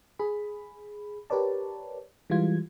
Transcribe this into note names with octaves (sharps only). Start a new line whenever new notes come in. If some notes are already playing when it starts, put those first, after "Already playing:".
G#4 B5
G4 A#4 B4 C#5 D5 A5
E3 G3 G#3 F4 G#6